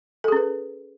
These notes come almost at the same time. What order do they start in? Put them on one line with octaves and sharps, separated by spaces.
A4 G#4 C#4 B4